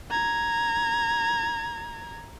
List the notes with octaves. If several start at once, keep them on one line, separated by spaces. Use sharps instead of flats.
A#5 G#6